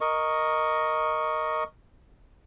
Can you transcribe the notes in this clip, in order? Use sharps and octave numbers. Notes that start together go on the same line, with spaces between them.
A#4 D#5 C#6